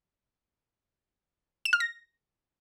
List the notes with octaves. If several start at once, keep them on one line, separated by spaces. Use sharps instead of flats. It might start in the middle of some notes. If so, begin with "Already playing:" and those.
E7
F6
A#6